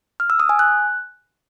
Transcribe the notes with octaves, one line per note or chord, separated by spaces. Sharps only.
F6
E6
D#6
G#5
F#6